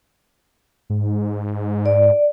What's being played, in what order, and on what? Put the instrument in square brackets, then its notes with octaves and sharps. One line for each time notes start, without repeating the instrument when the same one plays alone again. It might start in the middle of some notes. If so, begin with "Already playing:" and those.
[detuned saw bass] G#2
[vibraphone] D5